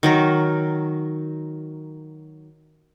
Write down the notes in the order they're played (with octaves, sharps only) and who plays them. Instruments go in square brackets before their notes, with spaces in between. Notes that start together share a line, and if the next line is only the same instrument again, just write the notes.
[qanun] D#3 F#3 A#4